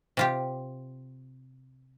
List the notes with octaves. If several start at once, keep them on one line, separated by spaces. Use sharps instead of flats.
C3 F4 G4